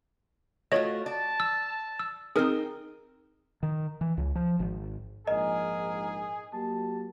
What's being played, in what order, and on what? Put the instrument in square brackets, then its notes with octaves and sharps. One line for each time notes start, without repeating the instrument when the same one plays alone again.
[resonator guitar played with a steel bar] A3 F4 F#4 [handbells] C#5 D#5
[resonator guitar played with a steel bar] D5 [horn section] A5
[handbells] E6
E6
[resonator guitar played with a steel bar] C4 D#4 [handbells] G#4 A#4
[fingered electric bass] D#3
E3
C#2
F3
G#1
[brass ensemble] A#1 G#2 [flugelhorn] G#4 [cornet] A#4 [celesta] D#5
[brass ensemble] F#3 A#3 G4 [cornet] A5